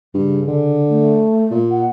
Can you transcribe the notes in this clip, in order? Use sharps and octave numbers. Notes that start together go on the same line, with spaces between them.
G2 C#3
D3
A3
A#2
F#5